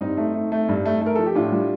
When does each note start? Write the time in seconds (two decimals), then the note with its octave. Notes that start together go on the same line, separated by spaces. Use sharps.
0.01 G2 C4 D#4
0.17 A3
0.34 A3
0.52 A3
0.69 G2
0.85 A3
1.01 A3 A#4
1.15 F3 A4
1.26 G4
1.35 A2 D4 F4
1.52 G3